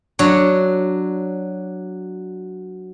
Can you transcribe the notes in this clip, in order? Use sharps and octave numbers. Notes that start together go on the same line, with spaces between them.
F#3 D4 C#5